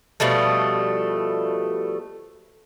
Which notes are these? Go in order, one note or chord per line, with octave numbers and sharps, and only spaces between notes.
B2 F3 G3 A3